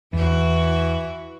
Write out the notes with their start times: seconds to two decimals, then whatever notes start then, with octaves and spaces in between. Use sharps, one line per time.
0.13 E2 E3 E4 F#4